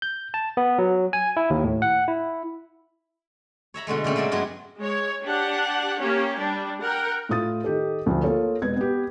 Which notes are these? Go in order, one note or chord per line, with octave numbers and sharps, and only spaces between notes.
G6
A5
B3
F#3
G#5
E4
D#2
A2
F#5
E4
C#5 E5 A#5 B5
B2 D3 G#3 A3
A#2 C#3 A3 C4
F#3 G#3 A#4 D5 E5
G2 F#3 G#3 B3 E4
G#3 C#5
D4 G4 F#5
A#3 C#4 G4
G3 D4
A#4 F#5 G5
A2 F4 D#6 A6
D#3 G4 A4
D2 F3 A3
A#3 F4 A4 C#5
E1 B2 B4 G#6
B3 G4